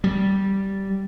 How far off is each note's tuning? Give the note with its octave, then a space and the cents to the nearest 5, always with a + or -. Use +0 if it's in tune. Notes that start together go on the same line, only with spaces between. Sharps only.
G3 -10